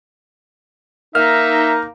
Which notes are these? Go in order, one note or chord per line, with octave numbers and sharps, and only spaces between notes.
A#3 D#4 E5 F6